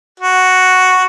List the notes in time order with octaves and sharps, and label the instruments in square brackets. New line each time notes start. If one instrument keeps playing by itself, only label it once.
[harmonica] F#4